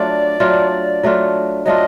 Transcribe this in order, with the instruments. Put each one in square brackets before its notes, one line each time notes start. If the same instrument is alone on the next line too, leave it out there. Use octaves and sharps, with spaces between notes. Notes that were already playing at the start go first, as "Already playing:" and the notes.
Already playing: [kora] F#3 A3 D4 F4 [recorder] D5
[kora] F#3 A3 D4 F4
F#3 A3 D4 F4
[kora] F#3 A3 D4 F4 [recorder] D#5